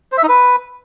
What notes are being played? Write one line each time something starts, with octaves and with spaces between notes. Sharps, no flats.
C5
E5
D#4
B4